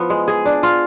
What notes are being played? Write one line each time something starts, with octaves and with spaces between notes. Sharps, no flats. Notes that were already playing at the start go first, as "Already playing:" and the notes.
Already playing: F3 B3 E4
G#3
G#4
D4
F4